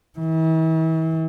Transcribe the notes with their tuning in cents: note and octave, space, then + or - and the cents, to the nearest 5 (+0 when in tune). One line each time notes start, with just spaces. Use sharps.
E3 -40